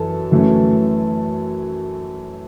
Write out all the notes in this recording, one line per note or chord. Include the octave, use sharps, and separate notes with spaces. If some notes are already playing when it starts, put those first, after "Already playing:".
Already playing: F#2 E3 A4
F#2 E3 A3 C#4